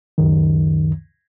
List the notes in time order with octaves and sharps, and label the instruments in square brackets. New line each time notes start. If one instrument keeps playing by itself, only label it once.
[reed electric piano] C#2 F#2 D#3